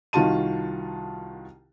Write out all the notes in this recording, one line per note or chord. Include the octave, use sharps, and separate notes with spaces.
C2 D#3 F4 F#4 A5 D#7